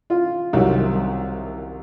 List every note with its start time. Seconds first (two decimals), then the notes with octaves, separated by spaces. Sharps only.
0.10 F4
0.53 C2 C3 D#3 F#3